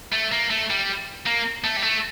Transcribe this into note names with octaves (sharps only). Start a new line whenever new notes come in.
A3
A#3
A3
G3
A#3
A3
G3
A3